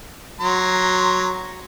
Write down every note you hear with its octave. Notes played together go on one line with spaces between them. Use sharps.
F#3 A#5 C6